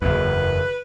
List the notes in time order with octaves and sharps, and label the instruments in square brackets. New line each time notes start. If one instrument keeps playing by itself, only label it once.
[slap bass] F#1 E2 [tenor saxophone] B4